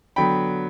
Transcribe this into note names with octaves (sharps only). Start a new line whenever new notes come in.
D3 F#3 B3 G5 B5